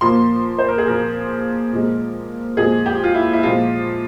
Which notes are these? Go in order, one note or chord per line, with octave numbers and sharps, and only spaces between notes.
A#2 F3 A#3 C6
C5
A#4
G#4
A#2 F3 A#3 A#4
A#2 F3 G#3
A#2 F3 G#3 G#4
G4
F4
E4
E4
A#2 F3 G#3 F4